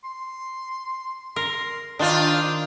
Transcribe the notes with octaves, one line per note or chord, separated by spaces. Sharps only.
C6
A#4 C6
D#3 D4 F4 C5